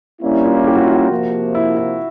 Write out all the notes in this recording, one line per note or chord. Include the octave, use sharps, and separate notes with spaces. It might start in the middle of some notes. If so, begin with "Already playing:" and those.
G3 A#3 C#4 D4 E4
F4
G4
F#4
F4
F#4
C3 F3 A#3
E4
E4